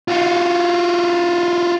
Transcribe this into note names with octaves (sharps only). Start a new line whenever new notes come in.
F4 F#4